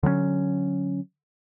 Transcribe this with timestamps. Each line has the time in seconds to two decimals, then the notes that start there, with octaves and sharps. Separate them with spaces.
0.03 D3 F#3 G3 C#4